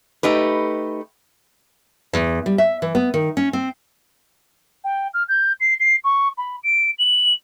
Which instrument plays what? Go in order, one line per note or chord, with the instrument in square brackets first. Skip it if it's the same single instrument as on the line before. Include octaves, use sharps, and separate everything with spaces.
[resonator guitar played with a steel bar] A3 D#4 G4 B4
[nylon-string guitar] E2
G3
E5
E3
B3
D#3
C#4
C4
[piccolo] G5
F6
G6
C7
C7
C#6
B5
D7
F#7